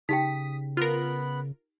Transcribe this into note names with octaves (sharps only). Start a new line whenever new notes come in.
C#3 D#4 G4 G5 D#6 B6
B3 F4 A#4 B5 F#6